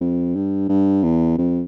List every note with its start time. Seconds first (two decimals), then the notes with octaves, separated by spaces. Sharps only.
0.01 F2
0.36 G2
0.69 G2
1.03 E2
1.38 F2